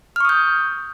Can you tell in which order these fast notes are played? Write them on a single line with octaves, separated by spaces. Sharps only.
F6 C#6 D#6 G6